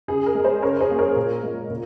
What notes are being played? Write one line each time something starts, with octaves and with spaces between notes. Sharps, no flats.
C#3 G#4
A#4
G#3
G#4 C5
C#3 A#4 C#5
G#4 C5
F#3 A#3
A#4 C#5
A#2
G#3
A#2